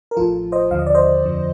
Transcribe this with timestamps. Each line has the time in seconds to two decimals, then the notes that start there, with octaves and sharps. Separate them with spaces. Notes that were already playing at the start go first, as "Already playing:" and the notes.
0.11 A#4
0.16 A1 A2 F3 F4 A4
0.52 C5 D#5
0.71 D#2 D3 F3 F5
0.79 D#5
0.86 D5
0.95 C5 D#5
1.25 F2 D3 F3